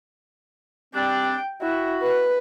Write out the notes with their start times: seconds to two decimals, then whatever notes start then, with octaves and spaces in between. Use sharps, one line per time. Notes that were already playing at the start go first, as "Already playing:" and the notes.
0.95 G3 C4 D4 G5
1.61 E4 F#4
2.03 B4